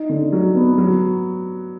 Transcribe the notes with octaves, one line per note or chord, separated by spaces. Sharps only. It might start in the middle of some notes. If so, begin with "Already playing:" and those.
Already playing: D#4
D3
F#3
B3
F#3